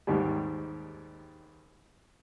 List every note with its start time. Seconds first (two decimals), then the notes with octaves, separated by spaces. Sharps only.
0.07 D#2 G#2 D#3 G3